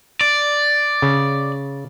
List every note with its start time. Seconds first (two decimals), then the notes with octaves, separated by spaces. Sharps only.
0.21 D5
1.02 C#3